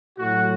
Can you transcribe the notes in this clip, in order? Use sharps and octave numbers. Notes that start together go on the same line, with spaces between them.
A2 F#3 F#4